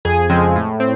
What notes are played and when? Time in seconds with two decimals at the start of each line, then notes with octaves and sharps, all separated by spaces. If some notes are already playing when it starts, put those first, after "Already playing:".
0.05 F2 G#4 G#5
0.30 C#3 F3 G#3 C4
0.56 A2
0.80 C4